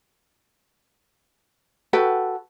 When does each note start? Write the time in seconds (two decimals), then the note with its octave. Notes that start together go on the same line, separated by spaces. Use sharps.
1.93 F#4 A4 B4 G5